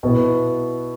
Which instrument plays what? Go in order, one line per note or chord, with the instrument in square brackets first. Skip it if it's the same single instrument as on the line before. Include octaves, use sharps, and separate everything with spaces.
[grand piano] B2 B3 E4